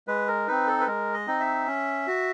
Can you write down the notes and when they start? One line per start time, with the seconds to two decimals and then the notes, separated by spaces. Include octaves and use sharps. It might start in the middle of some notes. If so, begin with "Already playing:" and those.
0.08 G#3 B4
0.28 A#4
0.47 C4 D#4 B4
0.67 A4
0.80 B4
0.87 G#3 A#4
1.14 D#5
1.27 C4 D#4
1.40 E5
1.67 C#4
2.07 F#4